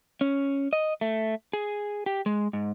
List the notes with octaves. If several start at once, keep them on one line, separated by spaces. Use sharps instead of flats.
C#4
D#5
A3
G#4
G4
G#3
G#2